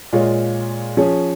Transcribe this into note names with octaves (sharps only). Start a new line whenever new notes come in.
A#2 G#3 F4 C#5
F3 C#4 G#4 C#5